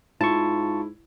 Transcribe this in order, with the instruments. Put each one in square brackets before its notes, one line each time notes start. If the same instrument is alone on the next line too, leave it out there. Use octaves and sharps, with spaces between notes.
[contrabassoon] G#2 [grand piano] E4 [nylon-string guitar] F4 [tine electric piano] A5 C#6